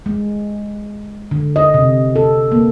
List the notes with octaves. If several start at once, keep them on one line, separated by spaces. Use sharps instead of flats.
G#3
D3
D#5
C3
A4
A#3